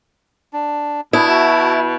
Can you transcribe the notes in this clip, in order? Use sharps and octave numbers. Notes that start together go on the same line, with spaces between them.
D4
B2 D4 E4 D#6
F#4 E5 A5